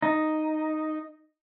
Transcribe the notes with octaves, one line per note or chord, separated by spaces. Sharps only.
D#4